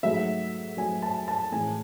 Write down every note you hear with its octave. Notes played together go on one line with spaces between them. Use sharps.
G#2 F#3 A3 E5
G#2 F#3 A3 G#5
A5
A5
A2 E3 G#3 G#5